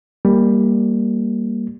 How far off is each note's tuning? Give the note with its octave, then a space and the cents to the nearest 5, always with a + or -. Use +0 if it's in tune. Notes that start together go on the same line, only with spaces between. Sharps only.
G3 +10 A#3 +0